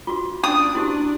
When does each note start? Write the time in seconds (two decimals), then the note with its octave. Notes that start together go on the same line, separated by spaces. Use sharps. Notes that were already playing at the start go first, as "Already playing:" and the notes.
0.07 F4 F#4
0.44 C#4 D4 D#6
0.75 E4 F#4 G4